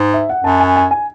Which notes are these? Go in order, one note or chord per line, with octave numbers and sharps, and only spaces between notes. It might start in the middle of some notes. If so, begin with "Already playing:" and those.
Already playing: G#2
E5
F#5
F#2 A5
G#5
G#5
G#5